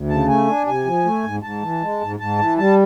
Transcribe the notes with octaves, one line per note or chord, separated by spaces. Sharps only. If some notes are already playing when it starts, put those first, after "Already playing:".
Already playing: D2
C#3 A5
A3 G#5
D4
C3 G#5
F3
A3
G#2
G#2 A5
E3
G#3
G#2
G#2 A5
E3
G3 A5